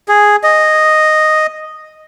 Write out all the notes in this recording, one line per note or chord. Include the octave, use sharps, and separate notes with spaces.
G#4
D#5